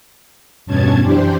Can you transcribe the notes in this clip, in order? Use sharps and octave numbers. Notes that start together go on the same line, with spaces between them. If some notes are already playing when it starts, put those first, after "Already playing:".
E2 G2 B2 C#4 A5 G#6
F#2 E3 D4 G4 C5